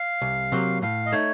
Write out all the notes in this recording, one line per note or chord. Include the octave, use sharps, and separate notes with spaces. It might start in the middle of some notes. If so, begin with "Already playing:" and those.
Already playing: F5
C2
C3 F#3 A#3
A2 F5
D#5
A3 D#4 C#5